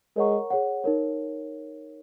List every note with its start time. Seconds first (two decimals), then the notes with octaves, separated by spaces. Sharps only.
0.16 G#3 A#4 C#5 F#5 A#5 C#6
0.50 G#4 C#5 F#5
0.84 D#4 A#4 C#5